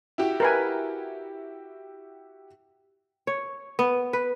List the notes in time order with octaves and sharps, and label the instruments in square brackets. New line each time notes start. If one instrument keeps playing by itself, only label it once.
[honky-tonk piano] E4 F#4 G4
[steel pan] A#4 B4 G#5
[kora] C#5
B3
B4